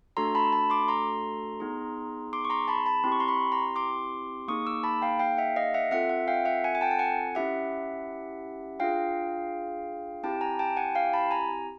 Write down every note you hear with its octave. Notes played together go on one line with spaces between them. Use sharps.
A3 D4 F#4 A4 A#5 C6
A5 B5
A5 B5
C6 D6
A#5 C6
B3 D#4 G#4
C6 D6
C#6
A#5 C6
A5 B5
A5 B5
C4 E4 G4 C6
C#6
A#5 C6
B5 C#6
A#5 C6
C6 D6
A#3 D#4 G#4 C#6 D#6
D6 E6
A5 B5
F5 G5
F5 G5
E5 F#5
D#5 F5
E5 F#5
C4 F4 A4 E5 F#5
E5 F#5
F5 G5
E5 F#5
F#5 G#5
G#5
G5 A5
A5
F#5 G#5
C#4 E4 G4 E5 F#5
D4 F4 G#4 F5 G5
C4 E4 G4 G5 A5
G#5 A#5
G5 A5
F#5 G#5
F5 G5
A5 B5
G#5 A#5